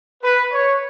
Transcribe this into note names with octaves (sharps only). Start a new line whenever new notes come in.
B4
C#5